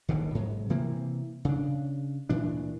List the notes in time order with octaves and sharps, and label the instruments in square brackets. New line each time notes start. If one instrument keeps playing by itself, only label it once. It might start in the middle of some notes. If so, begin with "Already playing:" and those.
[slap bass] D#1 A#1 B2 D#3
G#2 F#3
C3 E3 A#3 C4
C#3 D4
D2 A#2 E3 D4